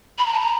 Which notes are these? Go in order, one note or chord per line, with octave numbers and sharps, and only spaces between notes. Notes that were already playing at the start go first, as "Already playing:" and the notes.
B5
A#5
A5
A#5